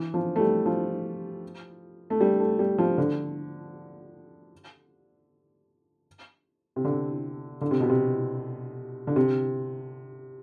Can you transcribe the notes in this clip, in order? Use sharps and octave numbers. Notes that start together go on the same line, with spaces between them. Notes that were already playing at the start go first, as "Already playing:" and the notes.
Already playing: E3
F3
A3
G3
F3
A3
G3
A3
G3
F3
D3
C3
D3
D3
C3
B2
C3
D3
C3